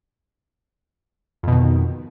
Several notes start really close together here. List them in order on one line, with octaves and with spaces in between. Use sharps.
F2 B2 D#3